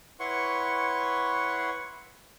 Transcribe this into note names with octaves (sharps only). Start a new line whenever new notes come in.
E4 B4 C#5 F#5 C6 C#6